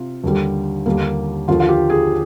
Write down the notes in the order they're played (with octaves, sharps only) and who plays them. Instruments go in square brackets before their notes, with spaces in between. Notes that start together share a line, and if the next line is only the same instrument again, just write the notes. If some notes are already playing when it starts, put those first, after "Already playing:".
Already playing: [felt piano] C3 F4
D#2 D3 G3
D#2 D3 G3 A#3
D#2 D3 F3 F4
F4
G4
G#4